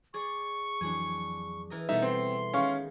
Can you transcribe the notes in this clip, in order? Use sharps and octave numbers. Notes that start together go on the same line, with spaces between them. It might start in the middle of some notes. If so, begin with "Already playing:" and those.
G#4 D5 C#6
F2 E3 F#3 D4 G#4 G#5
E3 A#4 D#5
B2 G3 A3 B3 D#4 E5
C4 C6
D#3 G#3 C#4 F5 C#6